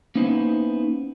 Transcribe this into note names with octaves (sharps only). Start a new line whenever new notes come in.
A#3 B3 C#4 D#4 E4 C5